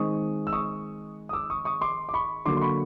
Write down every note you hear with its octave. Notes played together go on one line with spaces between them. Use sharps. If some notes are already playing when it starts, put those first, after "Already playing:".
Already playing: D#3 G#3 C4 D#4 C#6 D#6
E6
C#6 D#6
D#6
D6 E6
C#6 D#6
C#6 D#6
C6 D6
D6
B5 C#6
D3 F#3 A#3 C6 D6
C6
B5 C#6